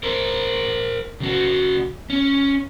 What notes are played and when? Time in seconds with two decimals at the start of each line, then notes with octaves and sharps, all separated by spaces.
0.03 A#4 C5
1.20 C#3 F#4
2.10 C#4